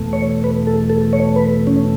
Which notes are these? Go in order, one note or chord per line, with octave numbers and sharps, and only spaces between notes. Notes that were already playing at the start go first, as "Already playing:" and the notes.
Already playing: E2 B2 A3
C#5
B4
A4
A4
C#5
B4
C#4